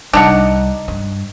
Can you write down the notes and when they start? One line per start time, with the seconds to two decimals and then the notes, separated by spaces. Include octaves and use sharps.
0.13 C2 G3 D4 D#4 F#5
0.88 G2